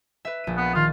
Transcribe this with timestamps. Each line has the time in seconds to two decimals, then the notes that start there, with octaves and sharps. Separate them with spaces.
0.25 B4 E5
0.44 A#1 D#7
0.57 B3
0.75 D#3 F4